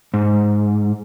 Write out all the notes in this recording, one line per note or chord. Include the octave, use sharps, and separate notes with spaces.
G#2